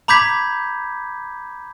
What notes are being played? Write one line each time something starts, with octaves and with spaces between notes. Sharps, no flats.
A#5 B5 D6 G6 G#6 B6